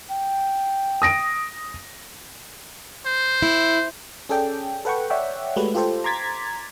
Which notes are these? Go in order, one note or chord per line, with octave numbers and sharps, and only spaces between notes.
G5
D#6 A#6 D7
C5
E4
C#4 G#4 A4 D5 G5
A4 B4 F#5 G5 C#6
C#5 D5 E5 F#5 G5
G#3 A3 F#4 G4 B4
F4 G4 A4 C5
A#5 C6 D6 G#6 A6 B6